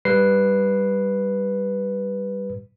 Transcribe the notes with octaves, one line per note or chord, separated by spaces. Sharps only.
G3 B4 C7